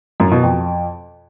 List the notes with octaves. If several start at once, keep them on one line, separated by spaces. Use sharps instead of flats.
F#2
B2
F2